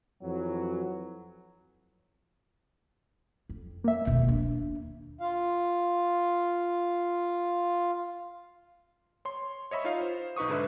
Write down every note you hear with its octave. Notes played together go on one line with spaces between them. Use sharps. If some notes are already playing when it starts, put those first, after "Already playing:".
F2 E3 F#3
F2
A#3 E5
F1 D#2 B2
A#3 D4
F4 F5
C#5 C6
C#5 D#5 E5 B5 C#6
D#4 F4 C#5 D#5 F5
C5
B1 D#4 B4 C#6 D#6
G#2 D3 B4 E5